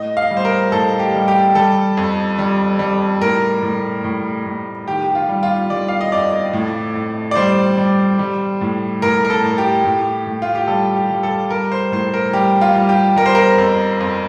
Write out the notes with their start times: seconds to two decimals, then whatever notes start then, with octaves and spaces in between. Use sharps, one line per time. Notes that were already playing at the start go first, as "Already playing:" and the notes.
Already playing: A2 D#5
0.17 F5
0.31 G3
0.37 C5
0.45 A#4
0.72 A2 A4
0.99 G4
1.14 G3
1.28 G4
1.55 G3 A4
1.97 F2
2.39 G3
2.79 G3
3.21 A2 A#4
3.63 A2
4.04 A2
4.46 A2
4.87 D#3 G4
5.04 G4
5.15 F4
5.29 G3
5.43 F4
5.70 G3 D5
5.88 F5
6.01 D#5
6.12 F2 D5
6.53 A2
6.95 A2
7.31 D5
7.36 G3 C5
7.78 G3
8.19 G3
8.61 A2
9.02 A2 A#4
9.25 A#4
9.30 A4
9.44 A2
9.58 G4
9.85 A2
10.27 A2
10.42 F4
10.55 G4
10.67 G3 A4
10.96 G4
11.10 G3
11.23 A4
11.50 G3 A#4
11.72 C5
11.92 A2 C5
12.14 A#4
12.33 G3 G4
12.61 F4
12.75 G3
12.89 G4
13.16 G3 A#4
13.26 C5
13.35 A#4
13.58 F2
14.01 F2